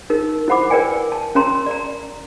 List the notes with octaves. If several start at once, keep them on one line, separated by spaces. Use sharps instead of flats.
D#4 A#4
E4 C5 F#5 B5 D6
A#4 B4 D5 G5 G#5
A5
C#4 A#4 C#5 A#5 C6
D5 A#5